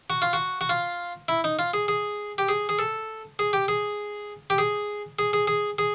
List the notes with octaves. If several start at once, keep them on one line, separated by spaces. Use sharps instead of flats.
F#4
F4
F#4
F#4
F4
E4
D#4
F4
G#4
G#4
G4
G#4
G#4
A4
G#4
G4
G#4
G4
G#4
G#4
G#4
G#4
G#4